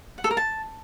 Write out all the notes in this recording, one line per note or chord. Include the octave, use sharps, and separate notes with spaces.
F#5
A4
A#4
A5